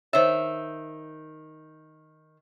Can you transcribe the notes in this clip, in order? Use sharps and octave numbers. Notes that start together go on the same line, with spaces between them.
D#3 C5 C#5 E5